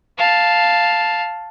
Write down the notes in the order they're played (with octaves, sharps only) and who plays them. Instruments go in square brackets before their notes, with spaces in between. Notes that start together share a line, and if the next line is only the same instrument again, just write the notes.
[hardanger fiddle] F5 A5